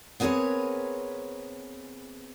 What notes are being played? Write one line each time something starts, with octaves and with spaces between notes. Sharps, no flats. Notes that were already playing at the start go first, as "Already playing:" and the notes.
B3 C4 G#4 A#4 B4 C#5